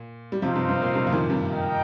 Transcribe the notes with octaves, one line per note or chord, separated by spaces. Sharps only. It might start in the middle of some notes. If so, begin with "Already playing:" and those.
Already playing: A#2
G3
C3 F3 C4 D#4 C5 F5
G2 C3
G2
A#2
G2 C3
F3
A#2 D#3
G2 C3
D#4 A#4 D#5 G5